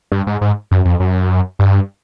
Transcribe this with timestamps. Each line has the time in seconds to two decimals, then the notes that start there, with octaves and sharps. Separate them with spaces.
0.12 G2
0.27 G#2
0.41 G#2
0.71 F#2
0.85 F2
1.00 F#2
1.59 G2